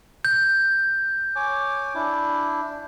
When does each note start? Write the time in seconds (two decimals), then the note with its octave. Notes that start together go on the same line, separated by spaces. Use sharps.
0.25 G6
1.36 C#5 G#5 D6
1.95 D4 E4